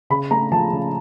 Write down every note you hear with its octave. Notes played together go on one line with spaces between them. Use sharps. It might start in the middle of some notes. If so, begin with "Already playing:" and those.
C#3 B5
A3 A#5
F3 A5
C#3